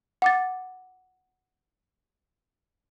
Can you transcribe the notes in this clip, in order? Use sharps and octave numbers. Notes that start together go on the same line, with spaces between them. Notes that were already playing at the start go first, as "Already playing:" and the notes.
F#5 D6 A6